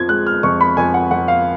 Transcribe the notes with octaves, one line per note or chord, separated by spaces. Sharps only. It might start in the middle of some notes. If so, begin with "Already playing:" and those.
Already playing: F2 F3 G#6
G#3 F#6
F6
F2 C#6
B5
F2 G#5
F#5
F2 F#5
F5